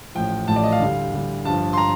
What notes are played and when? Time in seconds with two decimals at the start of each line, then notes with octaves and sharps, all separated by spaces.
0.15 A1 A2 F3 G5
0.48 A1 A2 F3 A5
0.56 D5
0.63 D#5
0.72 F5
0.80 D2 D3 G3
1.12 D2 D3 G3
1.45 G1 G2 F3 A5
1.73 C6
1.78 A#5